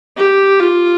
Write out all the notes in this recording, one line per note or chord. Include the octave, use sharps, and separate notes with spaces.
G4
F4